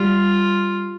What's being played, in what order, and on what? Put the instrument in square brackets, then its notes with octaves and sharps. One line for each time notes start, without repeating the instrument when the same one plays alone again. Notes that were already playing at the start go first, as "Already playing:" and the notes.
Already playing: [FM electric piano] G3 [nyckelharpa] F4